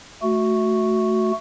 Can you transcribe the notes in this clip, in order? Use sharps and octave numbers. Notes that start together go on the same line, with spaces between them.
A3 F#4